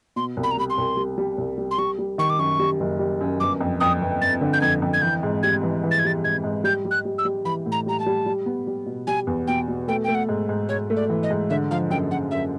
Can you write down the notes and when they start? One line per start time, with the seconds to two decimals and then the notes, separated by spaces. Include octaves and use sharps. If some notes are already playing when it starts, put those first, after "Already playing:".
0.16 B2 C6
0.37 C2
0.43 B5
0.51 A#5
0.57 G3 B5
0.70 C6
0.78 C2
0.97 G3
1.18 G3
1.38 C2
1.58 G3
1.71 C6
1.78 G3 C#6
1.99 G3
2.18 D#3 C#6
2.30 D6
2.39 F#2 C#6
2.59 G3
2.80 F#1
2.99 G3
3.21 F#2
3.40 G1 D6
3.61 F2
3.80 F2 D#6
4.02 G1
4.21 G1 A6
4.41 D3
4.53 G6
4.61 F2 G#6
4.82 F2
4.93 G#6
5.02 E3 G6
5.23 G#2
5.43 G3 G#6
5.63 E3
5.84 E3
5.91 A6
5.99 G#6
6.04 G3 A6
6.24 G#2 G#6
6.44 G#2
6.64 G3 G6
6.85 G3
6.91 F#6
7.05 G3
7.18 E6
7.25 G3
7.45 E3 B5
7.66 A2
7.72 A#5
7.86 G3 A#5
8.00 A5
8.06 G3
8.26 G3
8.46 B3
8.67 G3
8.86 B2
9.07 G3 G#5
9.27 E2
9.47 B2 G5
9.68 B2
9.88 A3 G5
10.04 A3 G5
10.15 F#5
10.29 G#2
10.49 G#2
10.69 G#2 C#5
10.90 A3
10.96 D5
11.10 E3
11.23 D#5
11.31 G#2
11.50 D3 E5
11.71 F3 F5
11.90 F#2 G5
12.11 F#2 F#5
12.31 F#2 E5